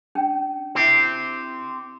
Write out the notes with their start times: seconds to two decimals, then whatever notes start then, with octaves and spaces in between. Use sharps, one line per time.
0.15 C#4 D4 G5
0.75 C4 E4 G4 E5